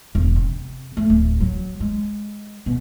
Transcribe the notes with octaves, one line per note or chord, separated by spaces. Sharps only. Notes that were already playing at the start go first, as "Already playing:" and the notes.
E1
C3
A3
D1
F#3
G#3
B2